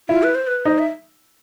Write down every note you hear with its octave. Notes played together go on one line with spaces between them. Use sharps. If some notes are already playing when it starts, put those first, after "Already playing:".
E4 F4
B4
C5
B4
D#4 C5
E5